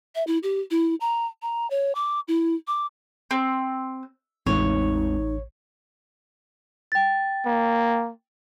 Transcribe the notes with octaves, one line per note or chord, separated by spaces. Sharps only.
E5
E4
G4
E4
A#5
A#5
C#5
D6
E4
D6
C4
A1 E2 G#3 C4 D#4 C#5
G5 A6
A#3